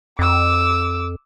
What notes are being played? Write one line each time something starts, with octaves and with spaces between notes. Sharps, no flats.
F2 D6 E6